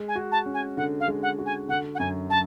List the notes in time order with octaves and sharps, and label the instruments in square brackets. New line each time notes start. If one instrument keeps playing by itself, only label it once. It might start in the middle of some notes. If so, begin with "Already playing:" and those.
Already playing: [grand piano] G#3
[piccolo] G#5
[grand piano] F#4
[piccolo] A5
[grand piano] C#4
[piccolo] G#5
[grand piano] D3 [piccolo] F#5
[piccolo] F5
[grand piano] G#3
[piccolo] F#5
[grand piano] F#4
[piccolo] G#5
[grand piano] D3 [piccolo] F#5
[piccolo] F#5
[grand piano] F#2 [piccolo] G#5
[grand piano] F#3 [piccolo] A5